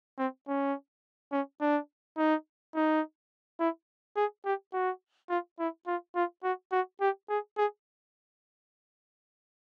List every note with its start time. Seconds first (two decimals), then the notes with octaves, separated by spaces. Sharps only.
0.18 C4
0.48 C#4
1.32 C#4
1.61 D4
2.17 D#4
2.75 D#4
3.60 E4
4.16 G#4
4.45 G4
4.73 F#4
5.30 F4
5.59 E4
5.87 F4
6.15 F4
6.43 F#4
6.72 F#4
7.01 G4
7.30 G#4
7.57 G#4